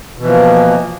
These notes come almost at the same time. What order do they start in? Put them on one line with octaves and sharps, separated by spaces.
B2 E3 F3 A#3